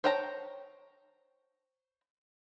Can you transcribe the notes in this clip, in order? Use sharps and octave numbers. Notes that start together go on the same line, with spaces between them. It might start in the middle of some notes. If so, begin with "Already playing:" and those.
C5 C#5 G5 A5 A#5